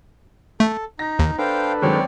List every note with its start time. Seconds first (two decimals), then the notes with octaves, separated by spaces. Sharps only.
0.60 A3 A4
0.99 D#4 A#6
1.19 D#2 D#3
1.39 D4 A4 B4 C5 F5 G5
1.82 D#3 F#3 G#3 C4 C#5 D5